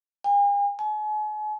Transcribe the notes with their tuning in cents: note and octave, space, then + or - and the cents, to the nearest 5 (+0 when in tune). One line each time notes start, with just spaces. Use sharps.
G#5 -45
G#5 +40